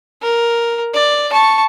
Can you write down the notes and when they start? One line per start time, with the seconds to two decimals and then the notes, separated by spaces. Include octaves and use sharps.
0.22 A#4
0.94 D5
1.33 A5 C#6